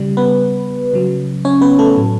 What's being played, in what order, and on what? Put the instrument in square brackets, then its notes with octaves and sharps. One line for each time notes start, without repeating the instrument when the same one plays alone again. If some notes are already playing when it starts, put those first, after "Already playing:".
Already playing: [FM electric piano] C#3 G3
B3 B4
C#3 F#3
C#4 C#5
B3 B4
A3 A4
A2 F#3